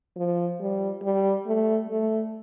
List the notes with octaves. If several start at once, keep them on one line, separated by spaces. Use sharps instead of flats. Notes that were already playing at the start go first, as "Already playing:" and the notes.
F3
G3
G3
A3
A3